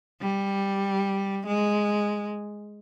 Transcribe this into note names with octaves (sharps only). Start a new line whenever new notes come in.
G3
G#3